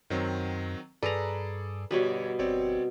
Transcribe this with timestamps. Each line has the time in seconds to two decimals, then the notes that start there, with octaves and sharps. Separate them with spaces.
0.10 F#2 D#3 F#3 C4
1.03 G2 G#4 A4 B4 D5 A#5
1.91 G1 B2 G3 B4 C#5
2.39 G1 C4 C#5 D5